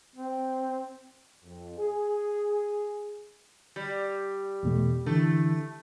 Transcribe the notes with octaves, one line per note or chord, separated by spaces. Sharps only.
C4
F2
G#4
G3
E2 B2 A3
D3 E3 A3